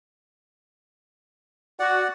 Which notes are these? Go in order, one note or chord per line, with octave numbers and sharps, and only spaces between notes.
F#4 D5 F#5